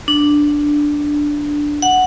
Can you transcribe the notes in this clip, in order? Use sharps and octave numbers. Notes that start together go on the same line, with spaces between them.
D4
F#5